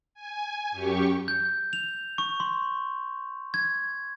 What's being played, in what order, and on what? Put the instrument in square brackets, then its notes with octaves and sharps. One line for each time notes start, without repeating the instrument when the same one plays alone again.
[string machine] G#5
F#2 G4 C#6
[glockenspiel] G6
F7
C#6
C6
G#6